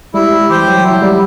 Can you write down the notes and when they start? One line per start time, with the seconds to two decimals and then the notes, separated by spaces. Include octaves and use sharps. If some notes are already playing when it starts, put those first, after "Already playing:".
0.14 G3 E4
0.32 G3
0.49 E3 G4 C5 G5
0.67 F#3
0.84 F#3 E4
1.02 G3